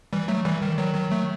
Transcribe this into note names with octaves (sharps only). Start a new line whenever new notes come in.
E3 G3
F#3 A3
E3 G3
D#3
D#3 F#3
D#3 F#3
F#3 A3